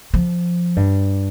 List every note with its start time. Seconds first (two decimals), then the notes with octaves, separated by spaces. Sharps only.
0.14 F3
0.76 G2